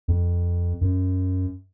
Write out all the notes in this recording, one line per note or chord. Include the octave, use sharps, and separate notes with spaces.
F2
F#2